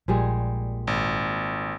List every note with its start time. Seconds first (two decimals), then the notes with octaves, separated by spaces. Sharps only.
0.08 A#1 A#2 G3 G#3
0.87 G#1